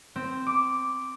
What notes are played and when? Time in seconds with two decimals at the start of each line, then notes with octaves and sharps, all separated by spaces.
0.16 C4
0.47 D6